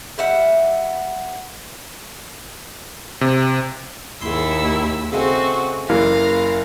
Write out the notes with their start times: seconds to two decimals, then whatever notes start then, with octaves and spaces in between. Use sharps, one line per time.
0.18 G3 E5 F#5
3.21 C3
4.21 D#2 G#2 E4 C6 E6
5.12 C#3 G#3 A3 C4 F#4 C#6
5.89 F#1 E3 A#3 F5 A#6